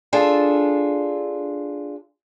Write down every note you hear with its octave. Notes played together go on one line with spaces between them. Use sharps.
D4 F4 G#4 A4